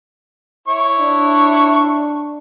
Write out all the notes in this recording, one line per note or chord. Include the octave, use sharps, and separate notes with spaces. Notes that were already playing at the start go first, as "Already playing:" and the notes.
E4 C#5 C#6
D4